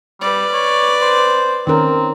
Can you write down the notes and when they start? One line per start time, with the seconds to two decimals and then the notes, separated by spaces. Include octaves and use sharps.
0.21 G3 B4 D5
0.53 C#5
1.02 C5
1.67 D#3 C4 C#4 A#4